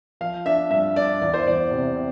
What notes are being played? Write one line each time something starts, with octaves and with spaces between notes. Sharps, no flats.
F3 F5
D4 E5
G2 E5
D4 D5
E2 D5
C5
E2 D5
C3
C4